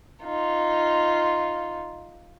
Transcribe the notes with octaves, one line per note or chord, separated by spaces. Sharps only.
D#4 F4